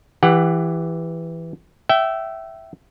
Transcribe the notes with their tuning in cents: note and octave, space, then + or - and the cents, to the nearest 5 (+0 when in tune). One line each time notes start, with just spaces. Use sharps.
E3 +5 G4 +25 F#5 +0
E5 +5 G5 -30